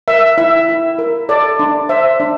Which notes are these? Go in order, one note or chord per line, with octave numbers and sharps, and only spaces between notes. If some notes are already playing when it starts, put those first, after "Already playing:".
A#4 E5
E4 E5
E4
A#4
A4 D5
D4
C5 E5
D4